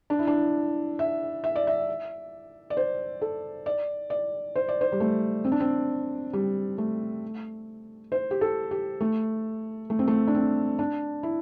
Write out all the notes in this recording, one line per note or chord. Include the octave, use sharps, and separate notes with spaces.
D4
E4
D4
E5
E5
D5
E5
D5
C5
A4
D5
D5
C5
D5
C5
G3
A3
C4
D4
C4
G3
A3
C5
G4
A4
G4
A3
A3
C4
A3
D4
C4
D4
E4